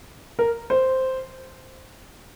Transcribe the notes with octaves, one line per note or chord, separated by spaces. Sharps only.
A#4
C5